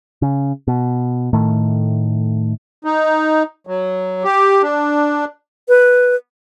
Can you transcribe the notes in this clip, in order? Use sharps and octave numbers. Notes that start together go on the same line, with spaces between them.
C#3
B2
A2 D#3 A3
D#4
F#3
G4
D4
B4